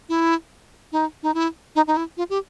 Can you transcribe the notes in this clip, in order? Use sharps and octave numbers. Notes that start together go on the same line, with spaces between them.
E4
D#4
D#4
E4
D#4
D#4
E4
F4
G4